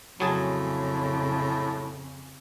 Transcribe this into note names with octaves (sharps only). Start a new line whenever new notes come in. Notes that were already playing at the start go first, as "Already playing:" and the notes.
F2 A2 C#3 F#3 G#4 A5